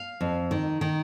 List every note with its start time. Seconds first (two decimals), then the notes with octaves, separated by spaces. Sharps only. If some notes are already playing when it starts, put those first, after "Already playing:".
Already playing: F5
0.21 F2
0.51 D#3
0.81 D#3